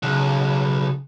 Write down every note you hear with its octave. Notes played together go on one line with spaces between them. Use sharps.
B1 C#3